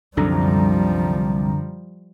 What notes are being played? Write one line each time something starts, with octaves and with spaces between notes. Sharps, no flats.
C2 F#2 D3 F3 G3 A#5